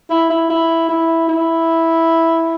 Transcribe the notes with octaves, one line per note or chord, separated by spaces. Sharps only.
E4
E4
E4
E4
E4